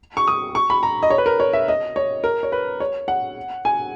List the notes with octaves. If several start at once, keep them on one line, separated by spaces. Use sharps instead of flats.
C#6
D#6
C#6
B5
A#5
D#5
C#5
B4
A#4
C#5
E5
D#5
C#5
A#4
C#5
B4
C#5
F#5
G#5